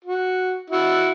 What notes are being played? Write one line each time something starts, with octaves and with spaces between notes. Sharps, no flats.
F#4
E4 F#4